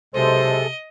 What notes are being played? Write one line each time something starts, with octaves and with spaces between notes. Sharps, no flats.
B1 C3 G#3 A4 C5 D#5